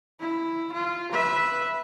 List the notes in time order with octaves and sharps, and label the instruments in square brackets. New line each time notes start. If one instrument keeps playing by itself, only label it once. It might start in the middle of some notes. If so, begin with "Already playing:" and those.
[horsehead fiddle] E4
F4
B4 E5